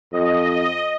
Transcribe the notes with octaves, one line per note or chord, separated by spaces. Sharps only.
F2 D#5